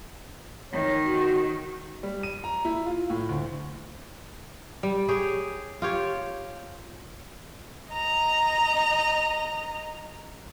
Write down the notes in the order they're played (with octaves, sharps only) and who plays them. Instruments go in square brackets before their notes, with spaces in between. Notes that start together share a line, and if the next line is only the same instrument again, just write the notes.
[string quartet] D#3 [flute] C#5
[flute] F#4
[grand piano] G3
D#7
A#5
E4
F4
A2
D2
[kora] G3
G4 G#4 C#5
F4 G4 C#5
[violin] D#5 A#5